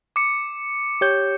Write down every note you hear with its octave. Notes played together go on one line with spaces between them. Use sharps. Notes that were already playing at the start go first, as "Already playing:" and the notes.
D6 C#7
G4 C#5 G6